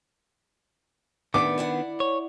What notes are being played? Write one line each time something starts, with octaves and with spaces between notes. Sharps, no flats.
A2 D#3 B3 D4 B4 D6
E4 D5 F#5
C#5